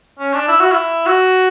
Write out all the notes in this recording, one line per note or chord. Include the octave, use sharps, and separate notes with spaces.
C#4
D4
E4
F#4
E4
F#4